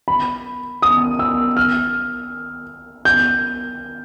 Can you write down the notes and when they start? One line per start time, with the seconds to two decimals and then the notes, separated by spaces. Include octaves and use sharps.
0.08 B5
0.82 D#6
1.19 E6
1.57 F6
3.05 G6